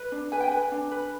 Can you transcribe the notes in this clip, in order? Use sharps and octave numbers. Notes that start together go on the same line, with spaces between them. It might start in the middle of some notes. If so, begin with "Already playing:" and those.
Already playing: B4
D4
B4 G#5
G5
B4 G#5
D4
B4